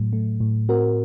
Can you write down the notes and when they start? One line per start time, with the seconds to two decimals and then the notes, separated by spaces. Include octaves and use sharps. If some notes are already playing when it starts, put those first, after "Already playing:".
Already playing: A2 F#3
0.13 A3
0.41 A2
0.69 C4 F#4 A#4